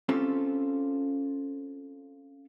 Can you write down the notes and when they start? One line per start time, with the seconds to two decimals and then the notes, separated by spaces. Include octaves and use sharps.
0.09 C4 C#4 F4 G4 A4